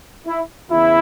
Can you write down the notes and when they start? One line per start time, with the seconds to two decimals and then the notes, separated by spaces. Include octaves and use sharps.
0.26 E4
0.70 E2 C#3 E3 E4